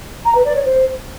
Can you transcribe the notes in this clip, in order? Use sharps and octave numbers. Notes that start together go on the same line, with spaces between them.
A#5
B4
D5
C#5
C5